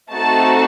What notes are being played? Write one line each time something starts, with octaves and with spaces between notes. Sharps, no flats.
A3 C4 D#4 F#4 A4 A5